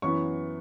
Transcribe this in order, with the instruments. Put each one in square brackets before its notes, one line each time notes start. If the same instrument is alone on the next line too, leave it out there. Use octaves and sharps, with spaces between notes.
[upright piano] F#2 E3 B3 C#6